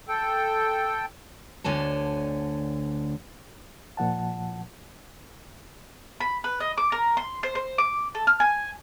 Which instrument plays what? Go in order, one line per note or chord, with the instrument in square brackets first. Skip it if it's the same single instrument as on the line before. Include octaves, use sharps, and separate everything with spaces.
[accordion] A4 G5
[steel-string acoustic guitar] D2 D3 C#5 G#5 A5
[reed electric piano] A#2 F3 F#5 A5
[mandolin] B5
B4
D#5
D6
A#4
C6
C5
C5
D6
A4
F6
G#5